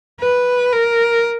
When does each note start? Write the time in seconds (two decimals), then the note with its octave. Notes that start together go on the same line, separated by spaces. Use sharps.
0.20 B4
0.72 A#4